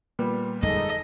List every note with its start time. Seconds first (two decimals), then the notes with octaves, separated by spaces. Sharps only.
0.19 A#2 G3 B3
0.63 G1 F2 G#3 D#4 G#4 A4 D#5